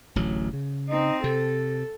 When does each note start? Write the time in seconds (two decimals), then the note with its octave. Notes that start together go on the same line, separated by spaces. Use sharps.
0.15 D1 A1 F#3
0.53 C#3
0.89 C4 D#4
1.24 C3 A4